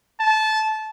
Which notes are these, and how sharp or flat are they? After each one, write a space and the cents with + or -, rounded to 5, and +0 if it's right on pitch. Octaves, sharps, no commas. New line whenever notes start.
A5 -20